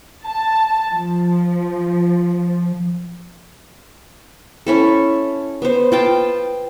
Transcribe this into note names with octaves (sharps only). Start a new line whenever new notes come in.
A5
F3
C#4 E4 A4
B3 C5
F4 G5 A5